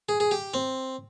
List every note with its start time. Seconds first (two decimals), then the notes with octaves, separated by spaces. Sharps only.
0.09 G#4
0.20 G#4
0.31 G4
0.54 C4